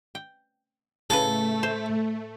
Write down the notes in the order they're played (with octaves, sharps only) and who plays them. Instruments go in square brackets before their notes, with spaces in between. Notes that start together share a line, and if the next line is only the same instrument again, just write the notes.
[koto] G5
[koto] A2 C#3 B4 [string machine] A3 [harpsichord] A4
[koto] C5